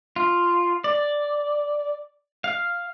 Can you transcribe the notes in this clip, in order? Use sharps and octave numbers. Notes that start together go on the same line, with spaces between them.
F4
D5
F5